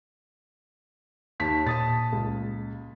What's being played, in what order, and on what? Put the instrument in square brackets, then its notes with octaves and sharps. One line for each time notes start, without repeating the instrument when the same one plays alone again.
[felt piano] D#2 A5 B6
[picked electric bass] A#2 [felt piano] A5 D#6 A6
[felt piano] C#2